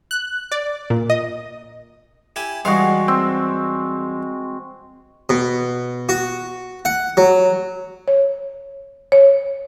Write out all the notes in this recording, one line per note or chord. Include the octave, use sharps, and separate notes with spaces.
F#6
D5
A#2
D#5
E4 G4 G#5
E2 G3 G#3 F#4 F5
C4
B2
F#4
F#5
F#3
C#5
C#5